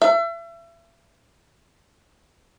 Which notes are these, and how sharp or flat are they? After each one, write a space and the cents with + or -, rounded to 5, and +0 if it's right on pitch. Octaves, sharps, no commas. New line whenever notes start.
E5 +35